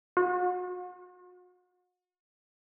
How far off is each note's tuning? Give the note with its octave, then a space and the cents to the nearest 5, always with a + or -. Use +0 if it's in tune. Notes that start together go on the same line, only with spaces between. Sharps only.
F#4 -40